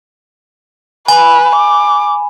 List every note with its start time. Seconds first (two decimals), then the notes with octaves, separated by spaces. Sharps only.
1.08 B4 G#5 B5
1.56 D6